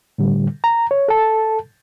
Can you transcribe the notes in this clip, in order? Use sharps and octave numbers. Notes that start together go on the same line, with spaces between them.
A2 D3 G3
A#5
C#5
A4 A5